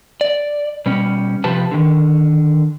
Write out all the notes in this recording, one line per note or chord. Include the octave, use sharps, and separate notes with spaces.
D5
B2 G3 C#4
C3 F3 G4 B4 A5
D3 D#3